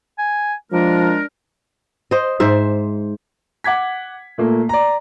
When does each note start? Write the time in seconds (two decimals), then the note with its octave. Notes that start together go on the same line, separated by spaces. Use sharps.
0.18 G#5
0.72 F3 G#3 D4 A#4
2.11 C5 D#5
2.40 G#2 C5 E5
3.64 F#5 D6 G#6 B6
4.38 A#2 A3 A#3
4.69 D5 A#5